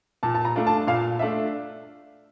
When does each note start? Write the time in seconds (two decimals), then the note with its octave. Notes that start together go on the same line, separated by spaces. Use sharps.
0.23 A#2 A5
0.35 A5
0.45 A#5
0.56 A3 D4 F4
0.67 A5
0.87 A#2 F5
1.19 A3 D4 F4 E5